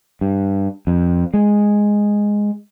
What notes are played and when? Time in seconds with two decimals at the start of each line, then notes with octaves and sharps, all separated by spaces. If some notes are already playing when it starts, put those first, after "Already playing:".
0.21 G2
0.87 F2
1.34 G#3